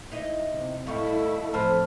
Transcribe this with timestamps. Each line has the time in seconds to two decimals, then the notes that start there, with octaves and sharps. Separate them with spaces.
0.12 D#4 E4 D#5
0.53 C3
0.87 A2 G3 E4 A4 D#5 F5 C#6
1.54 F2 A2 C5 A5 B5 F6